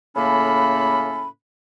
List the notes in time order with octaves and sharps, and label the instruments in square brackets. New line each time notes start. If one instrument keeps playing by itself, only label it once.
[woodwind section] A2 C#3 A#3 C#4 A4 B5